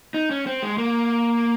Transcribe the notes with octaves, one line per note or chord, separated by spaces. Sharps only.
D#4
C#4
C4
G#3
A#3